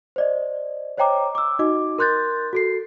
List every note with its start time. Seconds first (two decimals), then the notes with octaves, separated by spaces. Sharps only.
0.16 C5 D5 D#5
0.98 C5 C#5 D#5 G5 A#5 D6
1.35 D6 E6
1.59 D#4 F#4 D#5 D6
1.98 A#4 C6 F#6 G6 A6
2.53 F#4 A4 C7